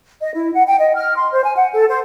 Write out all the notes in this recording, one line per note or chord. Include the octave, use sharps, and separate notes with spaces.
D#5
E4
F#5
G5
D#5
F6
C6
C5
G#5
F#5
A4
C5